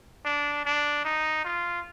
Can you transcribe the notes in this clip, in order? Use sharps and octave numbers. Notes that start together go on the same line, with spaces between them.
D4
D4
D#4
F4